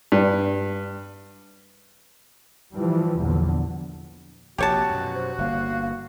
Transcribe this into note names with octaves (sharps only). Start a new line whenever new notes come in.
G2
E3 F3 G3
A#1 E2 D3 F#3
A#1 C3 F#4 G4 C#5 A5
F#2 B2
C5
G1 A#3 F5